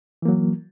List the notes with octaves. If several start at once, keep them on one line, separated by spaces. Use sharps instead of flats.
E3 F#3 A#3